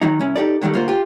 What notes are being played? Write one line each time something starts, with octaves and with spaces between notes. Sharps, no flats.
D#3 F#3 D#4
C2 C#4 E4
D#4 G4 A4 D5
D3 D#3 F#3 G3 A3
D2 A#3 F4 F#4 C5
F4 G4